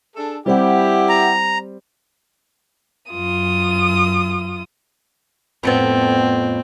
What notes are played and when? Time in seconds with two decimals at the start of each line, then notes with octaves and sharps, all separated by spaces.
0.16 D4 G#4 A4
0.46 G3 C4 E4 G4 E5 F#5
1.09 A#5
3.11 F#2 F4 D#6
5.63 F2 A2 B3 C4